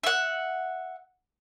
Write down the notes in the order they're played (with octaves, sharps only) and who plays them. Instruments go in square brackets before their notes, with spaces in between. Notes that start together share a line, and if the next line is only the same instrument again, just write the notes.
[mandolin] E5 F#5